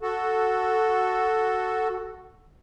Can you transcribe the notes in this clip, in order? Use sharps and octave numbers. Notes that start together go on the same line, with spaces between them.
F#4 A4